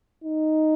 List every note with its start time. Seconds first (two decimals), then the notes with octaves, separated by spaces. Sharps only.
0.24 D#4